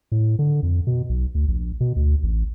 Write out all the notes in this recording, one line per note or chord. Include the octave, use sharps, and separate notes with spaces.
A2
D3
F2
B2
B1
D2
A#1
B2
D2
A1